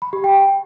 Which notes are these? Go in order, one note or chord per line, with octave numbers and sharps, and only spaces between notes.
B5
G4
G5